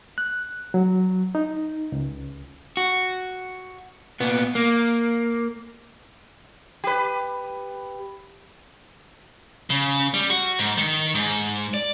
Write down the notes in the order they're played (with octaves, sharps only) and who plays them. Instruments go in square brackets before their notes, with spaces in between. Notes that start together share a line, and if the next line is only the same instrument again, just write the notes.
[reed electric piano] F#6
F#3
D#4
C#2
[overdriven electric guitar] F#4
A#2 B3
A#3
[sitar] G4 B4
[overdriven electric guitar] C#3
G3
F#4
G#2
D#3
G#2
D5